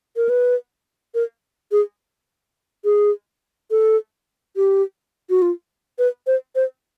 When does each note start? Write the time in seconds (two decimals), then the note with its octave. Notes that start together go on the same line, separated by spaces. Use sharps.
0.16 A#4
0.29 B4
1.15 A#4
1.72 G#4
2.85 G#4
3.71 A4
4.56 G4
5.30 F#4
5.42 F4
5.99 B4
6.27 C5
6.55 C5